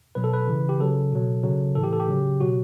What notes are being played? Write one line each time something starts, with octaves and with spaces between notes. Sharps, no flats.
B2 F#3 B4
A4
B4
C#3 E3
G4
C#3 F#3 A4
B2 F#3
C#3 F#3
A2 E3 A4
G4
A4
G4
C#3 F#3
B2 F#3 F#4